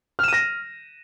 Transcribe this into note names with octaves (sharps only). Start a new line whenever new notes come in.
F6 A#6 D#7 E7